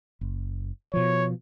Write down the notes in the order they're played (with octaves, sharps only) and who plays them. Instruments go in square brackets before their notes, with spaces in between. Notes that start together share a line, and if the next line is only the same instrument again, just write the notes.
[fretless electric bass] F#1
[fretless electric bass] B2 F3 [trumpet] C#5